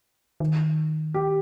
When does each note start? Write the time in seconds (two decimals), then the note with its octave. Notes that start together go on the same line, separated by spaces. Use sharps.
0.40 D#3
1.14 G4